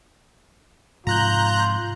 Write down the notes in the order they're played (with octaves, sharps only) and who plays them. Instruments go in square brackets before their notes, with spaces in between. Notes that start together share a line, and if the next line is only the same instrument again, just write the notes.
[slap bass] G#2 C3 F3 [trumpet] F4 [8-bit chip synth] A#5 F#6 G6